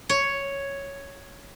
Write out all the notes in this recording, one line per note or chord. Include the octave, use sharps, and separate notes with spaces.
C#5